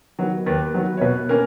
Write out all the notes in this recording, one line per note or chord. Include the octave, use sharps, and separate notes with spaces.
D#3 F#3 B3
D#2 B4
D#3 F#3 B3
C#5
B2 B4
A#3 C#4 A#4